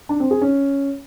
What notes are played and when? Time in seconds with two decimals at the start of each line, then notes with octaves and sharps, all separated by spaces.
0.09 D4
0.20 C4
0.31 G#4
0.41 C#4